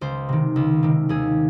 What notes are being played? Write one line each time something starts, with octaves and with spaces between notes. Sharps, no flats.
C#2 C5
C3 D#3
C#2
C3 D#3
D#2 G#4